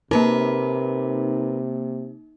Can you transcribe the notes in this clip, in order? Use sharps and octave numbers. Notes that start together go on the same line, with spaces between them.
C3 A#3 D#4 A#4 B4